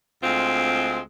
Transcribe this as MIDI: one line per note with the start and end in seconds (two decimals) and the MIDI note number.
0.23 1.00 38
0.23 1.00 56
0.23 1.00 60
0.23 1.00 65